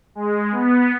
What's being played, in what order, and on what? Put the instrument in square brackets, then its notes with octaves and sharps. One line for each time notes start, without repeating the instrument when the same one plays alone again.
[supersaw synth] G#3
B3